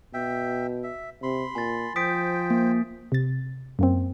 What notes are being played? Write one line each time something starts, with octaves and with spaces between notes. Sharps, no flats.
B2 E5 G5
E5
C3 B5 C6
A#2 G#5 A6
F3 C5 G5 D#6 B6 D7
A#3
C3 A6
F#2 A#3 C4